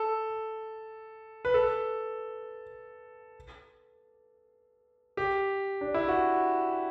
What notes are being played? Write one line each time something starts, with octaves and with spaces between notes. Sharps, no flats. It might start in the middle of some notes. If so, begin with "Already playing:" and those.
Already playing: A4
B4
A4
G4
D4
E4
F#4